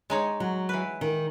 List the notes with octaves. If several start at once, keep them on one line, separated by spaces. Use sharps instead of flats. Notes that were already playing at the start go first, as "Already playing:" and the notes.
G#3 D#4 C#5
F#3
E3 B4
D#3